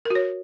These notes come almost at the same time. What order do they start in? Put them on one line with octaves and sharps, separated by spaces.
A#4 F#4 C#5